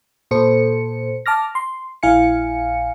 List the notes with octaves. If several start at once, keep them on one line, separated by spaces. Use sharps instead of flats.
A#2 A4 C5 C#7
A5 D6 F6 A#6
C6
A#1 E4 F5 G#5 C#7